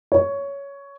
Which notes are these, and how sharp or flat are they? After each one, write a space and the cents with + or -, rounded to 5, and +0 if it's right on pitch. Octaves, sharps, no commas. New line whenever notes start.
C#5 +10